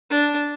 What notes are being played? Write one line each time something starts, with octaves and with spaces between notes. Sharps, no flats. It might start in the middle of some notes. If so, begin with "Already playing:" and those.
D4